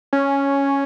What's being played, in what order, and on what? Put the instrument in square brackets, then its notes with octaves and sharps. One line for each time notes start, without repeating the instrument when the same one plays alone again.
[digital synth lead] C#4